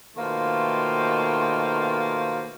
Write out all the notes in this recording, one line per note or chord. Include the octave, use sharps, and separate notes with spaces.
B2 D#3 A3 A#3 F4 C5